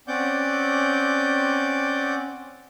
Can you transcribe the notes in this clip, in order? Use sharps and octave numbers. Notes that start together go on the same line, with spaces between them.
C4 C#4 D5 F#5 D6 G6